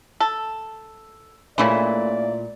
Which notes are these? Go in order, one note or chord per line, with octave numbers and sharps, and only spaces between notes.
A4
A#2 C#3 E3 A3 E4 D5